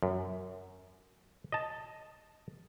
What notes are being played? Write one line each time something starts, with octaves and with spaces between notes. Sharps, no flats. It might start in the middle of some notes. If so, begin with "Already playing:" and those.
F#2
D#5 A5